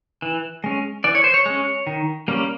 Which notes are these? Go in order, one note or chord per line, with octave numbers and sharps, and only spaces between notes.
E3
G#3 C#4
E3 D5
C#5
C5
C#5
G#3 C#4
D#3
G3 A#3 C#4